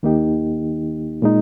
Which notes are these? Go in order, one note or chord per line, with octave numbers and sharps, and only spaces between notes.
D#2 D#3 A#3 D#4 G4
A#2 G#3 D#4